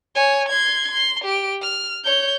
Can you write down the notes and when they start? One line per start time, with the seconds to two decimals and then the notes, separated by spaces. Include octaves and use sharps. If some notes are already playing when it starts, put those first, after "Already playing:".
0.15 C#5 G#5
0.49 C6 G#6
0.91 C6
1.25 G4 D7
1.62 F6
2.04 C#5 G6